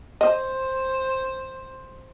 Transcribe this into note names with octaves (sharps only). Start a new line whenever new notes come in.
C5 D#5